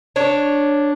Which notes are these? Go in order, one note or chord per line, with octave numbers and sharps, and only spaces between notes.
D4 C#5